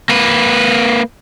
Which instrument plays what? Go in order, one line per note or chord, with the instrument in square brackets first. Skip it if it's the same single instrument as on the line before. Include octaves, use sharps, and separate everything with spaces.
[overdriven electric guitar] A#3 B4